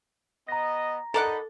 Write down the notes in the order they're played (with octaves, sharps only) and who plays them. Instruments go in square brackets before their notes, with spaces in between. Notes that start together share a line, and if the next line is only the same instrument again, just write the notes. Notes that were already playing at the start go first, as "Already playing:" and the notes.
[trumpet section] B3 D#5 [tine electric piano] A#5 A#6
[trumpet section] D#4 D#5 B5 [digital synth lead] A4 [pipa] A#4 D5 F#5